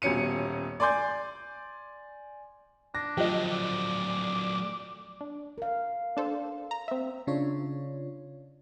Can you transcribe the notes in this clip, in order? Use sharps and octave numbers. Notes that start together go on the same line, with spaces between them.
D#1 B2 C#4 C#7 D#7
D5 G#5 C6 D6 G6
D4 A#6
F3 F#3 A3 G4 D#5
D5
D4
A#4 F5
D4 A4 C5
A#5
C4 E5
C#3 D4 F4 C#5